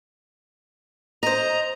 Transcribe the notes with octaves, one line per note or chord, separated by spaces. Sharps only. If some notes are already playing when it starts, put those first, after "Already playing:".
C5 D#5 A#5